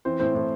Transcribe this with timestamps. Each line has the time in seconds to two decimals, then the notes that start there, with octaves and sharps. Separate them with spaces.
0.05 E3 C4 C5
0.20 A2 C4 C5
0.34 A2